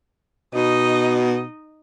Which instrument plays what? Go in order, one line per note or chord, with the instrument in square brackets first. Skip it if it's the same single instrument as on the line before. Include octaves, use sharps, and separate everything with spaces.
[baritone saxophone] B2 [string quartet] D#4 D#5